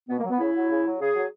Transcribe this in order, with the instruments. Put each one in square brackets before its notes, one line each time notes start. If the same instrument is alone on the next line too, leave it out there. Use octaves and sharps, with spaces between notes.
[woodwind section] B2 B3
A#3
F#3
B3
C#3 E4
F#3
C#3
F#3
C#3 G#4
F#3